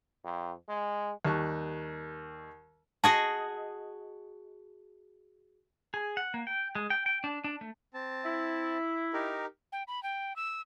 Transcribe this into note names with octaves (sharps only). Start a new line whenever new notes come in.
F2
G#3
D#2 G3 A5 C#6 F#6
F#4 G#4 D#5 A5
G#4
F#5
A#3
G5
G#3
G5
G5
D4
D4
A3
C4 A5
E4
D#4 G4 A#4
G5
B5
G5
E6